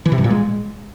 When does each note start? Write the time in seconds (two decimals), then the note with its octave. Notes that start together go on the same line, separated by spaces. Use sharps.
0.06 E3
0.12 C3
0.18 G2
0.24 A#2
0.30 G#3